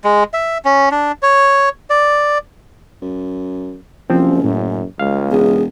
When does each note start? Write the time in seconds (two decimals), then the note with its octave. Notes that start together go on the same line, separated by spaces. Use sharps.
0.04 G#3
0.34 E5
0.65 C#4
0.91 D4
1.23 C#5
1.90 D5
3.02 F#2
4.10 F#1 C2 F3 C4 C#4
4.44 F#2 A2
4.99 C#2 G#3 F5
5.31 E1 G#4